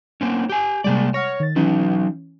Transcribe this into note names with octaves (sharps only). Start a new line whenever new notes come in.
A#3 C4 C#4
G4 G#5
C3 G3 G#3 A#3 G#4 D5
C#5 F#5 F6 A#6
D#3 A6
E3 F#3 C#4 D#4